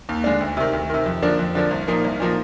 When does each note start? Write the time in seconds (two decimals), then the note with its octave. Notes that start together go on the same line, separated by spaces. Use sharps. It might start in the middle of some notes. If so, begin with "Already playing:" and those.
0.09 D#2
0.24 D3 G#3 D4
0.40 D2
0.57 C3 D#3
0.73 D2
0.90 C3 D#3
1.06 F2
1.22 D3 F3 A#3 D4
1.39 F2
1.55 D3 F3 A#3 D4
1.71 C2
1.88 A#2 F3 A#3 D#4
2.04 C2
2.20 A#2 F3 A#3 D#4